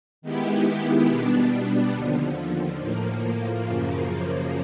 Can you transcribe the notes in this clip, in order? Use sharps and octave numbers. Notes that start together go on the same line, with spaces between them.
D#3 G#3 B3 E4 G4
B2 G3 B3 D4
D#2 D3 F3
A2 F3 A#3
F#2 C#3 F3 A#3